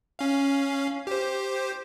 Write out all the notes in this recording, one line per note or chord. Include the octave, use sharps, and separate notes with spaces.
C#4 F5
G4 C5